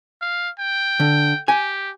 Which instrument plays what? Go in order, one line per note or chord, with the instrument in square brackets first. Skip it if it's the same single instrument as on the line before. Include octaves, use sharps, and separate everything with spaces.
[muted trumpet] F5
G5
[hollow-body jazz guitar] D3
[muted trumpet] G4 [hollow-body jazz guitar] G#5